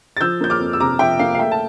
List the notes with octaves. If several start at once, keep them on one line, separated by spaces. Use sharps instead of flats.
A6
F3 E6 G6
A#3 G6
D6 F6
F2
E6
C3 A#5 D6
F3 E5 G5
A#3 F5
F5
A3 E5 G5
A5